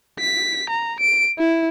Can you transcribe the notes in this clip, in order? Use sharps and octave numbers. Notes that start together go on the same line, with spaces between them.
B6
A#5
D7
E4